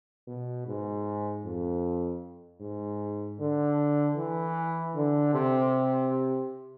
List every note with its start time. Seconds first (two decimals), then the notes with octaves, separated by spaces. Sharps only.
0.27 B2
0.67 G#2
1.45 F2
2.61 G#2
3.39 D3
4.17 E3
4.95 D3
5.34 C3